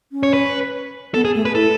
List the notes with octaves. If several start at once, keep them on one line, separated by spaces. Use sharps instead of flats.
C#4
C#5
B4
B3 A4
G#4
A3
B4
E4 A4